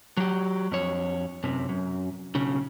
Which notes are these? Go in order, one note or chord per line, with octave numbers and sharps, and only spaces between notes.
F#3 G4
F2 C#5
F#2 C3
F#2
B1 C#3